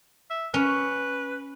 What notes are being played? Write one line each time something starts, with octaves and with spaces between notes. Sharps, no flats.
E5
C#4 B4